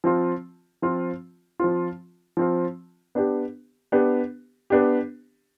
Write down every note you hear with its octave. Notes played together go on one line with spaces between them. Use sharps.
F3 C4 F4
F3 C4 F4
F3 C4 F4
F3 C4 F4
B3 D4 G4
B3 D4 G4
B3 D4 G4